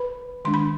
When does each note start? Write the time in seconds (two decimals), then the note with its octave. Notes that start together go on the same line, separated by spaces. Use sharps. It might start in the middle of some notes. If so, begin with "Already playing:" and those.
Already playing: B4 B5
0.45 D#3 G#3 D4 C6
0.54 B5